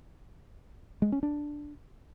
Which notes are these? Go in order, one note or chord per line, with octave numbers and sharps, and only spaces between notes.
G#3
C#4
D4